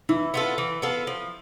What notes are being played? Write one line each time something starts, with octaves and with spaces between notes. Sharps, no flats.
E3 E4
B3 F4 A4
E3
B3 F4 A4
F3